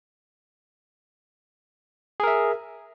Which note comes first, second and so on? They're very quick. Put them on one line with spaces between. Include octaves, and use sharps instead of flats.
G#4 A#4 E5